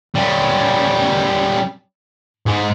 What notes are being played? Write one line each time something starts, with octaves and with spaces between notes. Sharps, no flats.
G3 C#4
G#2 G#3